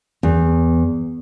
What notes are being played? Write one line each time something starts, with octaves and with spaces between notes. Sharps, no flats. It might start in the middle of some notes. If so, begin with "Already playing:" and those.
E2